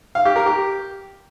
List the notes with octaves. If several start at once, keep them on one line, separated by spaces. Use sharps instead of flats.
F5
G4
A#4
G4